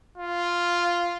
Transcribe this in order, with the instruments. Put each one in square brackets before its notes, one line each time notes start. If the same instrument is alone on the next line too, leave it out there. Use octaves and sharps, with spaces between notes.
[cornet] F4